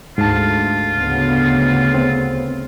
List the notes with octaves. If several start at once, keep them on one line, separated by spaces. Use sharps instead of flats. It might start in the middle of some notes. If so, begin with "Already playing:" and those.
D2 G#2 F4 A5
D2 C#3 B3
C4